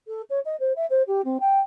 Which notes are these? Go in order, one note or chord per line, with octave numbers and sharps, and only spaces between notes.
A4
C#5
D#5
C5
E5
C5
G4
C4
G5